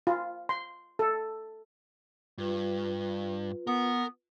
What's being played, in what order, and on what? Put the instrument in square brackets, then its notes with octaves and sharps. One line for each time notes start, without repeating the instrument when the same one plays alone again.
[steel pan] F4
C6
A4
[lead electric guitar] G2 [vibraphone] F4 B4
[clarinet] B3 [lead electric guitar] A#4